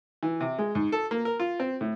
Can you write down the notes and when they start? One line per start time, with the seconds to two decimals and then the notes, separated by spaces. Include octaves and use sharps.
0.23 E3
0.40 C3
0.59 G#3
0.75 G#2
0.92 A4
1.11 A#3
1.25 A#4
1.40 F4
1.60 C4
1.81 A2